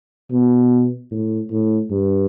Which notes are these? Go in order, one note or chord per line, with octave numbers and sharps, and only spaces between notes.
B2
A2
A2
G2